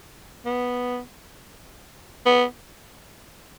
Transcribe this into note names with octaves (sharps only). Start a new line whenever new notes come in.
B3
B3